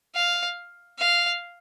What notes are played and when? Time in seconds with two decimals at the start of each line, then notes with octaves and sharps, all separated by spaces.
0.15 F5
0.99 F5